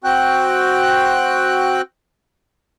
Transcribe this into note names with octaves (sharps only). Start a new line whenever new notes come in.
C4 F#4 G5 F#6